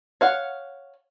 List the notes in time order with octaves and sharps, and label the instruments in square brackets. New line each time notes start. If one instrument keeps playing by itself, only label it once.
[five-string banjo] C#5 F5 F#5